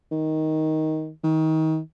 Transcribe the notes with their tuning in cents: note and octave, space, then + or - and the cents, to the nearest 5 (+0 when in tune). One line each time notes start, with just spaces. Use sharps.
D#3 +10
D#3 +30